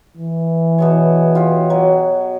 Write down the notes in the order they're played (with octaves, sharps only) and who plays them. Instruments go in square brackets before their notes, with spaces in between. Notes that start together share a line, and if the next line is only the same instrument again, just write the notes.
[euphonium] E3
[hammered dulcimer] B2 G#4 C#5
F4 G4 C#5
F#3